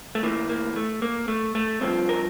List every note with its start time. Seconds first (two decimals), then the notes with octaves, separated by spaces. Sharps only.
0.15 A3
0.23 A2 E3 A#3
0.49 A#3
0.76 A3
1.02 A#3
1.28 A3
1.55 A3
1.81 G2 F3 C4
2.09 A#4